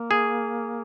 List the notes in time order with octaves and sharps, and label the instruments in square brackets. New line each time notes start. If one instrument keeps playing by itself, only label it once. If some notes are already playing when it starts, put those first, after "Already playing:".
Already playing: [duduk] A#3
[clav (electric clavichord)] G#4